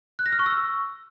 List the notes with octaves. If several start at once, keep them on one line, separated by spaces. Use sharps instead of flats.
F#6
A#6
F6
C#6
E6